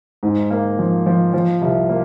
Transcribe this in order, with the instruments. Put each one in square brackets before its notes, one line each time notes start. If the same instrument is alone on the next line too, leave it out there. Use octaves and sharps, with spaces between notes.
[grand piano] G#2
A#3
F3
F3
F3
C2
A#3